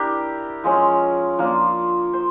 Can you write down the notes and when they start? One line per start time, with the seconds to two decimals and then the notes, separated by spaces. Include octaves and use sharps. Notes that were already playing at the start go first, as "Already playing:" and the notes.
Already playing: D4 E4 G4 A#4
0.64 F3 G#3 C#4
1.39 F3 A#3 D4 F4
2.13 C5